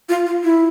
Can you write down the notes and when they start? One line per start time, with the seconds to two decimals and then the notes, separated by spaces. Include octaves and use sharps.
0.09 F4
0.26 F4
0.44 E4